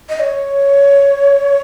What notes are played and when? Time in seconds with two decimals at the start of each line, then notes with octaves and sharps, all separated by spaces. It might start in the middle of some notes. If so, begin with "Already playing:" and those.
0.09 D#5
0.20 C#5